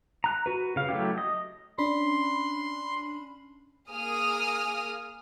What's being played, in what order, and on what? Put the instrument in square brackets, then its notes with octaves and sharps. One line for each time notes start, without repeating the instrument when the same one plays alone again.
[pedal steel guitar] A#5 F#6
F#4 B4
C#3 F5
F#3 A3 E4 G4
D#5
[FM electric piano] C#4 D4 B5 [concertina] C6
[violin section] A#3 G#4 D#6 F6